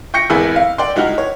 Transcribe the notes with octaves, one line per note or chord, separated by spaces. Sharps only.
G5 C#6 G6 A#6 C#7
G#1 E2 E4 G#4 B5 E6
F5
D5 F#5 G5 C6
C#2 D#4 E4 F#4 F#5 F6
C#5